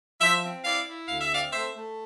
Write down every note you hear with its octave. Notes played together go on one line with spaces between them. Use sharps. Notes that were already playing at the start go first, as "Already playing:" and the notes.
F3 C5 E5
C4
E4 D5 F5
E4
D2 F5
E5
C4 D5 F5
A3 C5 E5
A3